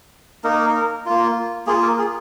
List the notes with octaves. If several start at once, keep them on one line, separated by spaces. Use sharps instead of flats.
A#3 D#4 A#4
A#3 F4
A#3 F4 G#4
A#4
G#4